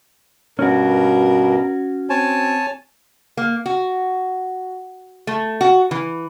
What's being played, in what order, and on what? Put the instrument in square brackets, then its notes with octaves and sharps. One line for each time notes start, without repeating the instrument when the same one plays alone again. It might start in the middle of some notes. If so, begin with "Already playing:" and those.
[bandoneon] G2 B2 [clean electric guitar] C#4 F#4 [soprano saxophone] A#4
[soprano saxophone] C4 [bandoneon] C#5 G#5 A5
[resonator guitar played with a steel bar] A#3
F#4
A3
F#4
E3